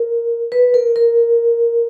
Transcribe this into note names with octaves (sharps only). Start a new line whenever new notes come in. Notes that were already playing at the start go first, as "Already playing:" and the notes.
Already playing: A#4
B4
A#4
A#4